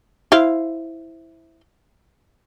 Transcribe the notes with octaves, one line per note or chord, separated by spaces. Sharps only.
E4 C5 F5